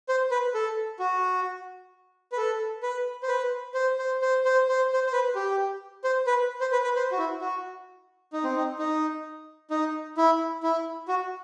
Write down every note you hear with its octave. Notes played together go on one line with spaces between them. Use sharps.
C5
B4
A4
F#4
B4
A4
B4
C5
B4
C5
C5
C5
C5
C5
C5
C5
B4
G4
C5
B4
C5
B4
B4
C5
F#4
E4
F#4
D#4
C4
D#4
D#4
D#4
E4
E4
F#4